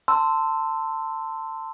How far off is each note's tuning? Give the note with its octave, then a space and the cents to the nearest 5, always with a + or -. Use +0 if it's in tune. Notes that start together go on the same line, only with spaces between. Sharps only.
A5 +20 C6 -10 E6 +0